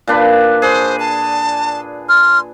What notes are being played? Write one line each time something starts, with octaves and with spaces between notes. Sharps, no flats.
A#2 D4 B4
G#4 C5
A5
C6 F6